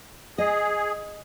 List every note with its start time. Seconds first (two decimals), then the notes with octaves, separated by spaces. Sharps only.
0.38 G#4 D#5